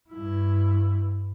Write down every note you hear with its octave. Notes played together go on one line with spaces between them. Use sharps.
G2 E4